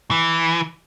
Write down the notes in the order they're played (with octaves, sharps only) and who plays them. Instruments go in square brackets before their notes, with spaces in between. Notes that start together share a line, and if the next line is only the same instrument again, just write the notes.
[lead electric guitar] E3